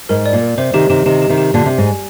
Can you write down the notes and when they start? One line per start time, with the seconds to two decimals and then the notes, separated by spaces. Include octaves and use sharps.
0.09 G#2 A#4
0.26 D5
0.33 A#2
0.41 A#4
0.58 C3 C5
0.73 C3 D#3 G4
0.90 C3 D#3 G4
1.06 C3 D#3 G4
1.22 G4
1.29 C3 D#3
1.38 G4
1.54 A#2 D3 D5
1.66 C3 G4
1.78 G#2
1.86 G#5